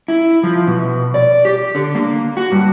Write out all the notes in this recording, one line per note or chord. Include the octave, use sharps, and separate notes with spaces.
E4
F3
B2
D5
G4
D3
A#3
F#4
G2